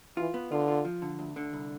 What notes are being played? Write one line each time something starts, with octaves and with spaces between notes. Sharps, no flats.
E3 F4
B3
D3 F4
F4
F3
D3
D2
D3
C2